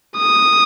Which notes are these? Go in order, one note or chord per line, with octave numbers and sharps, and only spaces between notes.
D#6